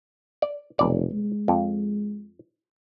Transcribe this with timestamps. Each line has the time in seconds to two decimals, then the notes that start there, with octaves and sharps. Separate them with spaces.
0.42 D5
0.79 F1 B1 D5
1.12 G#3
1.48 F2